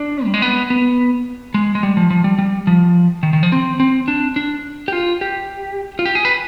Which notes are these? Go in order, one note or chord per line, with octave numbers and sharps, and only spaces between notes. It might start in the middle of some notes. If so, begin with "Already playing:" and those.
Already playing: D4
G3
G#3
B3
B3
G#3
G#3
G3
F3
F3
G3
G3
F3
D#3
D#3
F3
C4
C4
D4
D4
G4
F4
G4
F4
G4
G#4
B4